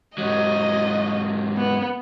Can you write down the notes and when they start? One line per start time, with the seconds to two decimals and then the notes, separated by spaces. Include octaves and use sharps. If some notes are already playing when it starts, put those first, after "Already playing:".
0.18 G#2 F#3 D#5
1.57 B3